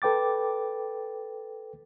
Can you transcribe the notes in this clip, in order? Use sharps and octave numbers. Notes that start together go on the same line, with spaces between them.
A4 B4 G5 D6 A6